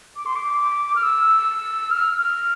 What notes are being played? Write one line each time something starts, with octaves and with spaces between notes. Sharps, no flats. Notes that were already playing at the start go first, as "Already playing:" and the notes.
D6
C6
D6
F6
E6
F6
F6